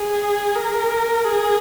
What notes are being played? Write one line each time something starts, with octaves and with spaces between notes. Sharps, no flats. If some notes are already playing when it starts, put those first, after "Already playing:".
Already playing: G#4
A#4
G#4